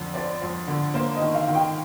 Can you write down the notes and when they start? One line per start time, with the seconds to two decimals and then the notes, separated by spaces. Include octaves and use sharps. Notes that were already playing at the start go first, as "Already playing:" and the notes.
Already playing: F2 D3
0.14 C4 D5
0.42 F2
0.67 D3
0.94 A#3 C5
1.15 D#5
1.21 D#3
1.34 F5
1.47 D#3
1.55 G5